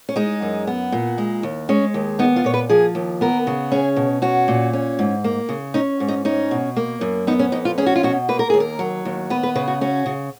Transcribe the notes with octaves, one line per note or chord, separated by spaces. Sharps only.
C#4
G#3 D#4
F#2
B3
A#2
G#3
D#2
G#3 C#4
D#2
B3 D#4
F4
A#2 C#5
B4
F3 G#4
D#2
B3 A#4
C#3
C#4 G#4
B2
C#4 F#4
A#2
C#4
G#2
A#3
C#3
C#4 D#4
G#2
D#4
C#4 D#4
B2
A#3
F#2
B3 D#4
C#4
F2 D#4
F4
C#4 G#4
F#4
F4
B2 F#4
A#3 B4
A#4
D#2 G#4
A#4
F#3
D#2
B3 B4
B4
C#3 B4
F#4
C#4 F#4
C#3